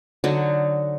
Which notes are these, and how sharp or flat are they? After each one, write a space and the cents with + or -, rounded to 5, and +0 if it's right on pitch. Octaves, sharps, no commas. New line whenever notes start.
D3 +0 F#3 +0 D#4 +0